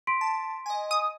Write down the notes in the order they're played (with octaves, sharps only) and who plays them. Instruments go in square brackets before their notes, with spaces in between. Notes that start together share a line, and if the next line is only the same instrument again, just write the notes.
[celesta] C6 B6 D7
[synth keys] A5
D#5 G#5
[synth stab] D#6